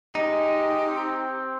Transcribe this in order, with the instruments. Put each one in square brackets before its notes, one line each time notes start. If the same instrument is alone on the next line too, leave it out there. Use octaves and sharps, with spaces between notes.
[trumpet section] G#3 D#5 [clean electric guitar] D#4 [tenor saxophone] G4
[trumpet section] C4